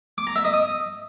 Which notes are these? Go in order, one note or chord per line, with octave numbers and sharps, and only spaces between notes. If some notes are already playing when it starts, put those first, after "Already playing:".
D6
A#5
E5
D#5
D#6